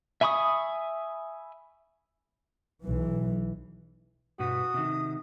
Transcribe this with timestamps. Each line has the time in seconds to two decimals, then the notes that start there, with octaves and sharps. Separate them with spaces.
0.21 E5 G#5 B5 C#6 D#6
2.84 B1 E3 F#3
4.39 G2 B2 F#4 B4 D#6
4.74 C3 D#3